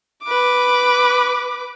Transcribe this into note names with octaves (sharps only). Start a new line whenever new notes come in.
B4 D6